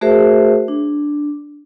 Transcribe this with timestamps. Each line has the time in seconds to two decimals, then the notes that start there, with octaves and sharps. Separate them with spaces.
0.01 A3 F#4 G#4 A#4 C5 E5
0.68 D4